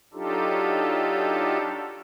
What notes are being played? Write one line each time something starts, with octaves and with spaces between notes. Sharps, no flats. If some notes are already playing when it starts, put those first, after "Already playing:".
F#3 D4 D#4 F4 G4 A4